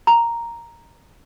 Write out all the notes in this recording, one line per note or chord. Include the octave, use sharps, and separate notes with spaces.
A#5